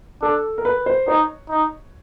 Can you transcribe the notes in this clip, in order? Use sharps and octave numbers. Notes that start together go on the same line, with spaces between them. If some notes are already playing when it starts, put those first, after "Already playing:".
D4 A4
A#4
B4
C5
D#4 C#5
D#4